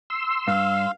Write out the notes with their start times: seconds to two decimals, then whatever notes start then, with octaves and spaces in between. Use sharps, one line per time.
0.10 C6 E6
0.48 G2 F5